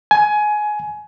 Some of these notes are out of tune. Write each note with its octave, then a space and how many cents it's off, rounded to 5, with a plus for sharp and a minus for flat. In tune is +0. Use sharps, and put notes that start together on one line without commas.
G#5 +20